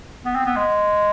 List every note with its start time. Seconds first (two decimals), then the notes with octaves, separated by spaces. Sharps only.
0.25 B3
0.35 C4
0.46 B3
0.56 G#3